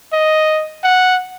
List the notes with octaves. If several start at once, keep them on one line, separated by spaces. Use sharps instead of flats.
D#5
F#5